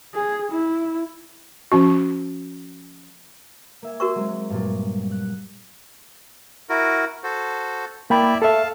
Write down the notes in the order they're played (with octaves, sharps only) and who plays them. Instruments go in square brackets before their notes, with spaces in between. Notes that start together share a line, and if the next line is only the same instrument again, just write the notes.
[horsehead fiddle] G#4
E4
[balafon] F3 C#4 F#4
[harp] A#3 E5 G#5
[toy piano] F#4 A#4 C#6
[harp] F#3 G#3 C4
G2 A#2 F#3
F#6
[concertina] E4 F#4 A#4
F#4 A4 C5
[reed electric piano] A#3 G5 B5 [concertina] E4 D5 E5
[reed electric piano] A4 E5 [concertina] F5 A5